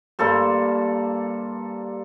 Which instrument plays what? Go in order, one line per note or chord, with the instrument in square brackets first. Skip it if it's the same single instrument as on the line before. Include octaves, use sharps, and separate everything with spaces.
[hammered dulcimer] G2 A#3 A4 C5